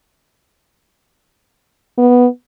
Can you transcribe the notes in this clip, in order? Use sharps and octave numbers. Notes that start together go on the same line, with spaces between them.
B3